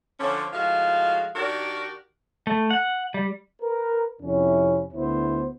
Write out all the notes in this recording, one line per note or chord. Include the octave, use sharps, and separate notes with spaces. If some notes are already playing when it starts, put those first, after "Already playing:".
D3 F3 C#4
A2 F3 G#3 F#4 F5
D#3 D4 F#4 G4 A#4 D5
A3
F#5
G3
A#4 B4
F2 C3 C#4 E4
D2 B3 E4 C5